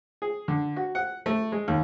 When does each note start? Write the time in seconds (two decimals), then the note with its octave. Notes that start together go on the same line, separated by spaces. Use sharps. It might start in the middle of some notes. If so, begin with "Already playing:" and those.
0.22 G#4
0.48 D3
0.76 F#4
0.95 F#5
1.26 A3
1.52 G#3
1.68 D#2